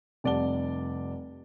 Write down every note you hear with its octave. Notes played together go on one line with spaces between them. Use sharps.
F1 G3 D5 F#5 A5 G7